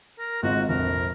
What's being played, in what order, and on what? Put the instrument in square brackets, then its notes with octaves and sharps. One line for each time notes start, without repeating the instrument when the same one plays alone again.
[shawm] A#4
[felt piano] G#1 G#2 F4 [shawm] F#4
[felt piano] F1 A#1 [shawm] A#4